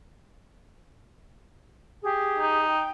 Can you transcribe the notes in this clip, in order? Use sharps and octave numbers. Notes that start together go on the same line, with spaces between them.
G4 G#4
D#4
G5